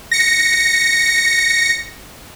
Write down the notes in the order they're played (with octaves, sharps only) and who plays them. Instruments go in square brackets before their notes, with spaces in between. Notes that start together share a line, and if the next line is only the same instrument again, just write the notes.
[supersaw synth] A#6 C#7